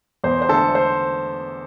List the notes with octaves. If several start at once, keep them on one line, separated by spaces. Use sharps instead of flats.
E2 C5
C5
D3 A3 A4
C5